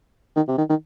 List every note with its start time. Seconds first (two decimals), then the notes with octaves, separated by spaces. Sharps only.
0.36 D#3
0.48 C3
0.58 D#3
0.70 D#3